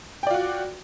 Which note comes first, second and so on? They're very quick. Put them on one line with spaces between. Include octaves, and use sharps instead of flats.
G5 D5 F4 F#4